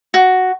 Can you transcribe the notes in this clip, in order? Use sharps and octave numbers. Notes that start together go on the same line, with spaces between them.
F#4